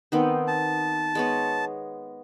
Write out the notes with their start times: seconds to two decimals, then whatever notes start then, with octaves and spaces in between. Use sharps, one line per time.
0.12 D#3 B3 C4
0.48 A5
1.15 G#3 B3 C#5